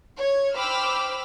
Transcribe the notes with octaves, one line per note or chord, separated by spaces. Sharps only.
C#5 G#6
C5 G5 B5 D6 E6 F6